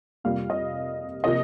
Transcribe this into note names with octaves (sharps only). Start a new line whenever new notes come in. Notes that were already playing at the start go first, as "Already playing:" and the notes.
F2 C3 G3 A#3 F5
D#5
C3 F3 A#3 D#5